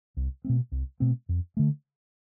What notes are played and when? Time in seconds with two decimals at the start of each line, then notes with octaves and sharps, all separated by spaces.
0.17 C2
0.45 B2 A3 C4
0.72 C2
1.00 B2 A3 C4
1.29 F2
1.57 D3 A3